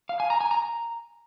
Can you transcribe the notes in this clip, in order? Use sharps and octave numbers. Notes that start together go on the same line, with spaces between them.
F5
G#5
A#5
G#5
A#5